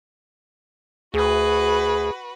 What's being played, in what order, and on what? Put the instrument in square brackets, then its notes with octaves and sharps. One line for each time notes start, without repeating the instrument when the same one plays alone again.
[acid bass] D2 [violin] F#4 B4 [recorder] G#4